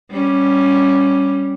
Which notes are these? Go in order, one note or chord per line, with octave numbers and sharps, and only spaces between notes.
G3 C#4